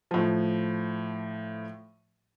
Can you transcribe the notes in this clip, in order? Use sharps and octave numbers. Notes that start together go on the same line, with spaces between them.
A2 F3